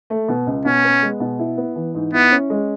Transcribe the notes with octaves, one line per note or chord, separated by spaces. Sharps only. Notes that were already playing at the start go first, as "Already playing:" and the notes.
A3
B2
C#2
B2 C#4
B3
G#3
B2
E4
B3
E3
G#2
B3 E4
C#4
G#3